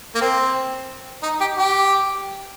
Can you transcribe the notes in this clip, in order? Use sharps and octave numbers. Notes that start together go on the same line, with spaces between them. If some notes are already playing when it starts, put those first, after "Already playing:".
A#3
C4
D#4
G4
G4